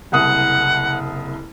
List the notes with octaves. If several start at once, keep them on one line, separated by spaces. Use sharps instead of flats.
F#1 C2 F#5 D#6